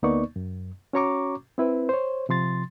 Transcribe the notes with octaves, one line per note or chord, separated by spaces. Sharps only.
D2 A#3 B3 D#4 D5 C#6
F#2
C#4 F#4 C#5 A#5 C#6 D6
C4 E4 B4
C5 C#5
C3 F3 C6 A6